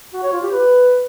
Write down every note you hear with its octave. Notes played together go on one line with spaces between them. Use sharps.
F#4
C#5
F4
G4
B4